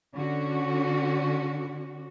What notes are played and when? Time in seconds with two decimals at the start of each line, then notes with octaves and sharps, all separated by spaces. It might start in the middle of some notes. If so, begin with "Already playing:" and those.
0.14 D3 C#4 F#4